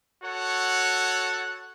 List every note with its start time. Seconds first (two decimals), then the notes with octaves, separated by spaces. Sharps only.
0.23 F#4 A4 C#5 F#5